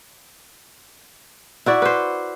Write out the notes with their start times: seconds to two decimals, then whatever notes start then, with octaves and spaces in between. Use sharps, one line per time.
1.66 E4 F#4 D5
1.82 B4 C5